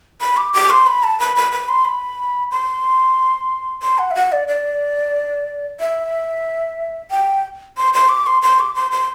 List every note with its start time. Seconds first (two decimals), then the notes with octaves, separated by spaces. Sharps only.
0.21 B5
0.37 D6
0.53 D6
0.70 C6
0.87 B5
1.03 A5
1.20 B5
1.36 B5
1.52 B5
1.69 C6
1.85 B5
2.51 C6
3.82 C6
3.98 F#5
4.11 E5
4.15 F#5
4.32 D5
4.48 D5
5.80 E5
7.11 G5
7.77 C6
7.94 C6
8.09 D6
8.27 C6
8.42 C6
8.60 D6
8.75 C6
8.91 C6